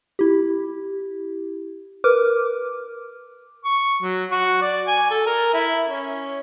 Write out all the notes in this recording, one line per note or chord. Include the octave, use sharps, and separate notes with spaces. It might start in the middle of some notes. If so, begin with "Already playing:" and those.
E4 G4
A#4 B4 D6 F6
C#6
F#3
F#4
D5
G#5
A4
A#4
E4
C#4